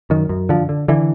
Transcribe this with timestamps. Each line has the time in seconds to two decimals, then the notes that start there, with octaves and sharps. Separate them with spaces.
0.10 F#2 D#3
0.29 F#2
0.49 D3 F3
0.69 D3
0.88 D3 E3